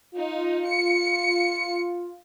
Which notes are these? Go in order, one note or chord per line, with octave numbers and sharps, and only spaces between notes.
D#4 F4
C#7